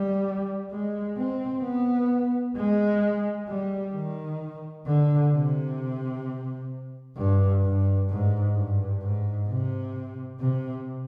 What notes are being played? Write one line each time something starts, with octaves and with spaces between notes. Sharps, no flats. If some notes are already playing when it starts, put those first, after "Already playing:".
Already playing: G3
G#3
C4
B3
G#3
G3
D#3
D3
C3
G2
G2
G#2
G2
G#2
C3
C3